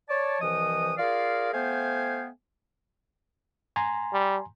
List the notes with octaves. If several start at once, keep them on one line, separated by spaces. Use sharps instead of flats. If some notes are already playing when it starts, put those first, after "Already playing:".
C#5 D5 A5
C2 E3 F3 D#5 D#6
F4 G#4 A#4 D5 F5
A3 B3 C5 F5 G5 G#5
G#5 A#5 C6
G3